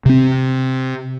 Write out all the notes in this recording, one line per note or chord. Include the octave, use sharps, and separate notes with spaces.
C3 C4